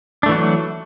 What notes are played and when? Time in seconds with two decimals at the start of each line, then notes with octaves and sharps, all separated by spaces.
0.23 D4
0.26 A3
0.29 E3
0.32 F#4
0.34 F#3